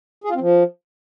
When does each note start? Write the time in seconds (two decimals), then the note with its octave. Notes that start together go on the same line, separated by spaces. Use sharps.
0.24 G#4
0.30 F4
0.35 C4
0.40 F3